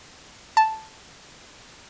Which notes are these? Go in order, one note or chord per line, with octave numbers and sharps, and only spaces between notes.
A5